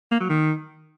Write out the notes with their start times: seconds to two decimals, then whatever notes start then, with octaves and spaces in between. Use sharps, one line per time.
0.11 A#3
0.20 F#3
0.29 D#3